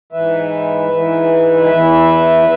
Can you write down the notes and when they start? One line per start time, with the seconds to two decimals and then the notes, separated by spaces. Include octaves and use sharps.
0.12 G#2 E3 B4 E5
0.90 G#2 E3
1.69 E2 E3